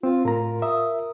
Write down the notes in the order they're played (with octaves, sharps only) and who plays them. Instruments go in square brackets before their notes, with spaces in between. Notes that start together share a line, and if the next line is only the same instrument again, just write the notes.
[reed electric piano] C4 [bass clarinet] F4
[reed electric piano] A2 A#5 [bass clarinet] F4 [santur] A#4
[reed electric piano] E5 [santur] D#6